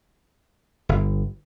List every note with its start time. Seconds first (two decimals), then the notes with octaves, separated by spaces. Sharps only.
0.89 G1